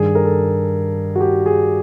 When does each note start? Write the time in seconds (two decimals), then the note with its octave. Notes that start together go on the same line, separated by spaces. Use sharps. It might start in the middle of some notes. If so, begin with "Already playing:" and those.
Already playing: G2 D#3 G#4
0.15 A#4
0.25 A4
1.16 F#4
1.21 G4
1.46 G#4